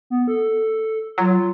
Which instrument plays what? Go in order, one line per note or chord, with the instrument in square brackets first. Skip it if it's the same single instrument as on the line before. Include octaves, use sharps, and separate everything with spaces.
[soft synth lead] B3
A4
[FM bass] F#3 [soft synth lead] F4